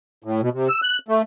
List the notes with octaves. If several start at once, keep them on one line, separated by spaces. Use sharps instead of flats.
A2
B2
C3
E6
F#6
A3